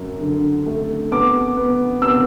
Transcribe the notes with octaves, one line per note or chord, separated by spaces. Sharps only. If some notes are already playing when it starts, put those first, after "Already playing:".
Already playing: F#2
D3
A3
B3 D6
B3
B3 E6